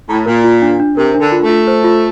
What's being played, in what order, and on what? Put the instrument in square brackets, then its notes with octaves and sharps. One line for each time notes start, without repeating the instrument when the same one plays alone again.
[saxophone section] A2 [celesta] A#5
[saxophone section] A#2 [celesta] A#4
[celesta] F4
D4
D4
[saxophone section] C3 [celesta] A#4
[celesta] D4
[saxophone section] D3
[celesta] F4
[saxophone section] A3
[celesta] F4
C5
F4